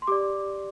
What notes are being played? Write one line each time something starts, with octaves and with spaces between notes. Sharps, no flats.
C6
G4 D5 D6